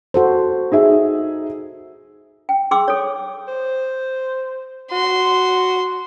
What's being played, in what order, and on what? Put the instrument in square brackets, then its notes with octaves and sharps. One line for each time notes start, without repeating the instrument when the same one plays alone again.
[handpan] F#4 A4 C5
[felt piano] D#4 G#4 E5
[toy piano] G5
G#4 G5 C6 D6 E6
A4 C#5
[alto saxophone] C5
[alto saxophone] F#4 [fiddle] C6